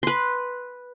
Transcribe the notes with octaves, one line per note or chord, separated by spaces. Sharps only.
B4 C6